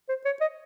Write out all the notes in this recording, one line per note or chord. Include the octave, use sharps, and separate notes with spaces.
C5
C#5
D#5